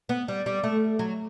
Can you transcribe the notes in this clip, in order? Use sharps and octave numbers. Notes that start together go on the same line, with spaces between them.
B3
G3
G3
A3
F#3